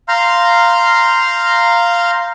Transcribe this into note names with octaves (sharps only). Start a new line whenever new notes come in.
F5 A#5 C6 F6 G6